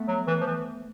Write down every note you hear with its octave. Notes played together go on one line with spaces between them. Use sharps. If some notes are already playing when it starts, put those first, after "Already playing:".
Already playing: A3 B3
F#3
E3
F3
E3